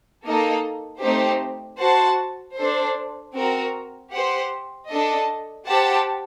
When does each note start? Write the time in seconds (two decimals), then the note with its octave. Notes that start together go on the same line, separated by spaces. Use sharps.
0.25 A#3 D#4 A4 D#5
1.02 A3 C4 D#4 G4 C5
1.79 F#4 C5 F#5 A5
2.57 D4 A4 C5
3.34 C4 F#4 A#4
4.12 G4 C5 F#5
4.90 D4 A4 D#5
5.67 G4 C5 F#5 A5